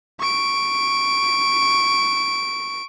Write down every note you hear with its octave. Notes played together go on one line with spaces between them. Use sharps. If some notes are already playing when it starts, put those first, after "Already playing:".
C#6 D7